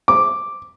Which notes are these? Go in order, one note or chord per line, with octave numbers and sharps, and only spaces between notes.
D6